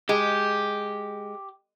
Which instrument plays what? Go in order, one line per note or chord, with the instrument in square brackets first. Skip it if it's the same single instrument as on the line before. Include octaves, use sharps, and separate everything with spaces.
[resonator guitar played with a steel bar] G#3 [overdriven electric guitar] G4